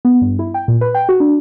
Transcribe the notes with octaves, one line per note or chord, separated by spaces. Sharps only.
B3
G2
E4
G5
A#2
B4
G5
F#4
D4